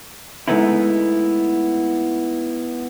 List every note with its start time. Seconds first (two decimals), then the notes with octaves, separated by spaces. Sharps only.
0.48 G#3 A3 B3 D#4 E4